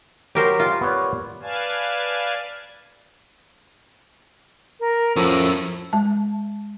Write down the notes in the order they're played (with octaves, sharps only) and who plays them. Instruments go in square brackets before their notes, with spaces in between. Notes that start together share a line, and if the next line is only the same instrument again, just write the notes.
[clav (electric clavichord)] F#3 [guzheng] G4 A#4 C5
[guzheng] F4
[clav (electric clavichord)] B3 C#5 D5
[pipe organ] B4 D5 F5 G#5 A5
[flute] A#4
[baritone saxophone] A2 [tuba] F3 [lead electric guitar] C#4 A#4 [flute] E6
[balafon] G#3 A5